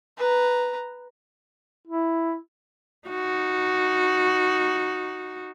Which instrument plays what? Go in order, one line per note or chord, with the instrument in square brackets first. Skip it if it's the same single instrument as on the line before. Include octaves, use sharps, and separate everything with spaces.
[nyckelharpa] B4 A#5
[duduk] E4
[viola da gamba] D#4 F#4